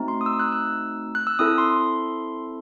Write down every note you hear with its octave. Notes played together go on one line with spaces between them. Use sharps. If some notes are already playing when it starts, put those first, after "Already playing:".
Already playing: A3 C4 D#4 F#4
C6
D#6
E6
F#6
E6
F#6
E6
C4 E4 A4 D#6
C6